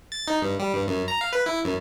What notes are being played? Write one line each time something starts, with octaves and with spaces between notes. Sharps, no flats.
A6
D#4
G2
G3
G2
F#2
A#5
F5
B4
E4
F#2